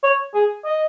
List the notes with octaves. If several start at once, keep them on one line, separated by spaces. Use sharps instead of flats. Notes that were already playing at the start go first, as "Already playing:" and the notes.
C#5
G#4
D#5